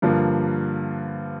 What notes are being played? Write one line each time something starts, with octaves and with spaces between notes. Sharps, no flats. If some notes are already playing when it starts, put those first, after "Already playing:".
G2 D3 F3 A#3